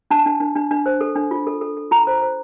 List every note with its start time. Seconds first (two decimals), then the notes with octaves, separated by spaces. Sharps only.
0.11 D4 A5
0.26 D4
0.40 D4
0.55 D4
0.71 D4
0.86 C5
1.01 A4
1.16 D4
1.31 F4
1.47 A4
1.61 A4
1.77 A4
1.91 F4 A#5
2.07 C5
2.22 C5